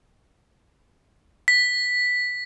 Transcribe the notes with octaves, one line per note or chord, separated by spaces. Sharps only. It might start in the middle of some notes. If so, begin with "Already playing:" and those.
B6